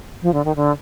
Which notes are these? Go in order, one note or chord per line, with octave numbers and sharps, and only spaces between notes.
F3
D3
D#3
D3